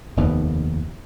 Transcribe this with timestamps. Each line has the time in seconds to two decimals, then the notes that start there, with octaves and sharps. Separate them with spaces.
0.17 F1 D#2 D#3 B3